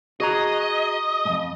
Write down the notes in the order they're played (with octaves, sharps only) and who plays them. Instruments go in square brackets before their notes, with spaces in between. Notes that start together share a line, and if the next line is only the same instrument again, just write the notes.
[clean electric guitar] F#4 G#4 A#5 [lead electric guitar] D#5
[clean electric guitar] F2 G#2